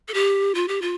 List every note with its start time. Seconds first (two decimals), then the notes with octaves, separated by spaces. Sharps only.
0.08 A4
0.14 G4
0.55 F4
0.68 G4
0.82 F4